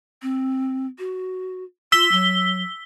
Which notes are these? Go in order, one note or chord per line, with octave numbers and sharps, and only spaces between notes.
C4
F#4
F4 E6 B6 G7
F#3